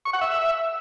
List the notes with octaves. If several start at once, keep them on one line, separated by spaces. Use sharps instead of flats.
C#6
F#5
E5